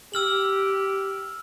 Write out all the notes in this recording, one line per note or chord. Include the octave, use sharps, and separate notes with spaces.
G4 E6 F6 F#7